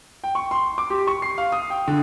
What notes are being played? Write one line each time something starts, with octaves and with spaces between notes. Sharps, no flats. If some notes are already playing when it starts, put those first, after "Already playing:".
G5
C#6
C6
D6
G4
C#6
C7
F5
D#6
G5
D3